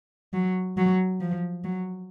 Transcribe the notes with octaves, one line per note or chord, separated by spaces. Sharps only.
F#3
F#3
F3
F#3